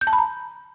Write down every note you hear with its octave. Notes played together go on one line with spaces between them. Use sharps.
G6
A5
B5
A#5